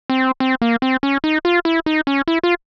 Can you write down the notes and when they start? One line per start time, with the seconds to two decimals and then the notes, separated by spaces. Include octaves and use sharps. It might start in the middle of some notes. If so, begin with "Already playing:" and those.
0.10 C4
0.40 C4
0.62 A#3
0.82 C4
1.03 C#4
1.24 D#4
1.45 F4
1.65 E4
1.86 D#4
2.07 C#4
2.28 E4
2.43 F4